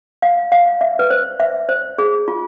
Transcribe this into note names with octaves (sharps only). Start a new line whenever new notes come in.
F5
F5
E5
B4
C5
E5
C5
G#4
F4